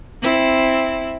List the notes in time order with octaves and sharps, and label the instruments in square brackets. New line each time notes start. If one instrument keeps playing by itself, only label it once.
[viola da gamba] C4 E4